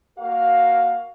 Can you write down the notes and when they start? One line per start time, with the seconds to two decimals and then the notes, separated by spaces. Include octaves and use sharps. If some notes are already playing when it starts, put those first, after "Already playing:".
0.18 A#3 F#4 A#4 F5